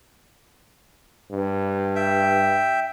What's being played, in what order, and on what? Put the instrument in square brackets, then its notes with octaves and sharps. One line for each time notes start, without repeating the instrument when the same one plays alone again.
[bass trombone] G2
[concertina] E5 G5